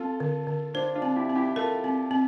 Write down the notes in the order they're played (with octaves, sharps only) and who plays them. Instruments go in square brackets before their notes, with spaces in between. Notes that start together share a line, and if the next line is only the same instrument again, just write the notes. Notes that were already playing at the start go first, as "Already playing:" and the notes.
Already playing: [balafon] C4 [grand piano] F4 A4
[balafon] D3
D3
[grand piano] D4 F4 [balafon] C5
[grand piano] D4 F4
[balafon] C4
[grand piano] E4 G4
[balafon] C4
[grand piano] E4 G4
[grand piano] F4 A4 [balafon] A#4
[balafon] C4
C4